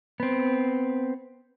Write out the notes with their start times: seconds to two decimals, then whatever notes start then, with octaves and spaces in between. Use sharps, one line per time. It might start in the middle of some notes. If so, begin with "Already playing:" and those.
0.20 B3 C4